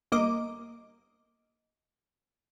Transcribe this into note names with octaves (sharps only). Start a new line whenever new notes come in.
G1 A#3 D#5 D6